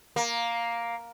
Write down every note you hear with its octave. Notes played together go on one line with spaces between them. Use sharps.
A#3